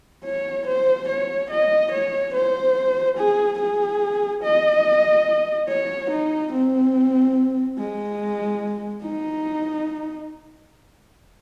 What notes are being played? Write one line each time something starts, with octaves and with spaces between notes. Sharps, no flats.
C#5
C5
C#5
D#5
C#5
C5
G#4
G#4
D#5
C#5
D#4
C4
G#3
D#4